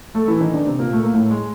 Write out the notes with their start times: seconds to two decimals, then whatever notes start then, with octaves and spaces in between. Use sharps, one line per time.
0.15 A3 A4
0.28 E3 E4
0.40 D#3 D#4
0.53 D3 D4
0.66 C3 C4
0.79 A#2 A#3
0.93 A3
1.03 A#3
1.13 A2 A3
1.31 G#3